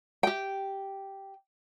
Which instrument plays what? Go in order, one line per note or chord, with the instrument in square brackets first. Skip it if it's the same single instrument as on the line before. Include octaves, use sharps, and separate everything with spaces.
[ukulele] G4 G5